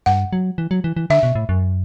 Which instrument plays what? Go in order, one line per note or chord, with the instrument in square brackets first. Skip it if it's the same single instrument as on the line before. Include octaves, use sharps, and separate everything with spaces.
[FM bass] G2 [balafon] F#5
[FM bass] F#3
E3
F#3
E3
E3
[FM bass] D3 [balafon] E5
[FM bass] B2
A2
F#2